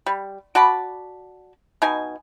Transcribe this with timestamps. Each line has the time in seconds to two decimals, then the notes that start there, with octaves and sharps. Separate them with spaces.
0.06 G3
0.55 F#4 D5 A5 B5
1.82 B2 D#4 G#5